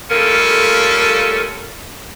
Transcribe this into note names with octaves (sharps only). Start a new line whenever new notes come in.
G3 A3 A#3 C#4 F4 A4